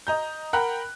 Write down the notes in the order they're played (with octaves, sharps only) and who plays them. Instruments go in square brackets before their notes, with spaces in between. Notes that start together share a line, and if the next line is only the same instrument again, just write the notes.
[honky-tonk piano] D#5 A#5 G6
A#4 F#5 G5 A#5 B5 F#6